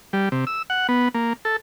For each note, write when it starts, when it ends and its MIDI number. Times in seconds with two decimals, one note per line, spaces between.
0.13 0.29 55
0.32 0.45 48
0.47 0.62 88
0.70 0.87 78
0.89 1.08 59
1.15 1.33 58
1.45 1.56 69